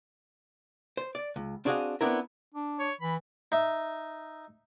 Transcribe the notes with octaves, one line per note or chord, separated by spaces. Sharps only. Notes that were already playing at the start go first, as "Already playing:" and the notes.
C5
D5
C#2
C4 D4 F#4 G#4 D#5 F5
B3 C4 D4 E4 A#4
D4
C#5
E3 B5
D#4 E5